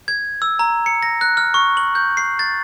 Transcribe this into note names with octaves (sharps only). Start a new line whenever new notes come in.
G#6
E6
A#5
C#7
A#6
F#6
F6
C#6
F#7
G6
C7
A6